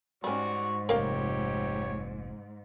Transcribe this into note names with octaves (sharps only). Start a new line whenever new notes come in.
G#2 G3 C#4 F#4 D5 C#6
F1 A#3 G4 A#4 C#5 F5 G5